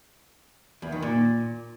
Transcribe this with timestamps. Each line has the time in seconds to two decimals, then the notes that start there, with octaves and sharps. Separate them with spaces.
0.82 E2
0.92 D#3
1.02 A#2